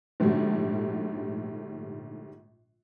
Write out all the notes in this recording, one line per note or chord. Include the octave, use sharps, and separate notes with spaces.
A#1 G#2 D3 F#3 G3 A3